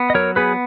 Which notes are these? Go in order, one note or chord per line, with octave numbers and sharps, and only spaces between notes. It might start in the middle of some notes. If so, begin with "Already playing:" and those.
Already playing: B3
D#5
F#3 A#4 C#5
B3 G#4 B4